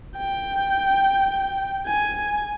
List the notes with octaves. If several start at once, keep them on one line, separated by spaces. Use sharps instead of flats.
G5
G#5